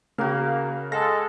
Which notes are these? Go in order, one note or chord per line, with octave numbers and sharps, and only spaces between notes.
C#3 A#3 F#4 F5
G#3 A4 F5 A5 A#6